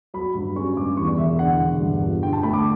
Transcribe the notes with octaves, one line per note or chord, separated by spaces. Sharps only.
F#3 B5
G2
C#4 C#6
G2 D6
E2 C#6
D5
E1 E5
D3 F#5
E1
G2
G1
D3 G5
A5
A3 B5
D6